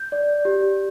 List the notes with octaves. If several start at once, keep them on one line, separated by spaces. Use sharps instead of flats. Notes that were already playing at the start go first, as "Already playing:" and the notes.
Already playing: G6
D5
G4